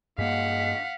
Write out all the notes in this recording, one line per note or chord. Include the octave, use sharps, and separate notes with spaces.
G2 G#3 A#3 F5 F#5 B6